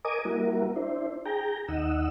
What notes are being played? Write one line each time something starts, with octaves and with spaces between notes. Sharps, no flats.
A#4 D#5 G#5 D6 D#6
G3 A#3 E4 F#4 A#4
D4 E4 C5
G#4 G5 A#5
D#2 D#4 D#5 F#5 E6